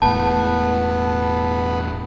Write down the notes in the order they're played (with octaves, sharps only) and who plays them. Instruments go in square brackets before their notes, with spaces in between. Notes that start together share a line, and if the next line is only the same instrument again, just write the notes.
[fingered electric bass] E1 A2 [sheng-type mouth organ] B3 [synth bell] A5